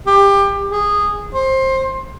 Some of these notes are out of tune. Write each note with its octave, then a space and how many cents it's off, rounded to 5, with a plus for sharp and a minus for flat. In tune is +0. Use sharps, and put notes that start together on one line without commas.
G4 +20
G#4 -15
C5 +20